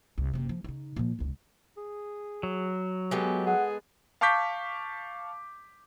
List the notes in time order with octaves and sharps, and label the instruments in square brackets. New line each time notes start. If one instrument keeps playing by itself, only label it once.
[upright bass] C2
F#1 C3
F3
C#3 D#4
A#2 F3
E1 C#2
[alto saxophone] G#4
[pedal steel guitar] F#3
[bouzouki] G#3 B3 A4 [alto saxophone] G4
[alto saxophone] G#4 [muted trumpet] F#5
[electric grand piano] F5 A5 C#6 D6 G6 B6